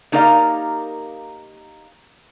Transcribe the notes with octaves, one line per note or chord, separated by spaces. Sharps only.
A#3 D#4 G4 A#4 D5 F5